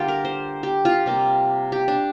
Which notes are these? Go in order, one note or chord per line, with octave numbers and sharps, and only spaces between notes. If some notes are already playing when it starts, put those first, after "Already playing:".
Already playing: D3 G3 A#3 F4 G4
A#4
C5
G4
F4
C3 G3 A#3
G4
D4